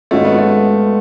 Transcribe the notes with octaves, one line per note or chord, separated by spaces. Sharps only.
G#1 G#2 G#3 A3 C#4 F#4
B3
A3